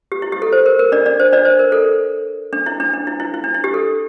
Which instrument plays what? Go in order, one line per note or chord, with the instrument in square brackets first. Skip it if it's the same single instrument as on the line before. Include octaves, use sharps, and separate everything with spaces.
[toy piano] G4
E4
G4
A4
C5
A#4
A#4
D4 D5
D4 D5
C5
D4 D5
C5
A#4
A4
D4
E4
D4
D4
E4
E4
E4
D4
E4
G4
A4